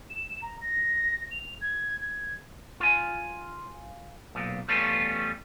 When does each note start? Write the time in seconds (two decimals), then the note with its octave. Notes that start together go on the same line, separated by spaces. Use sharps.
0.10 E7
0.42 A#5
0.61 A#6
1.31 F7
1.61 G#6
2.00 G#6
2.80 F4 G#5
4.35 B1 A#2
4.68 E2 G3 A3 C#4 F4 B4